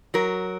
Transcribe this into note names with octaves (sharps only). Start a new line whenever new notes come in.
F#3 A#4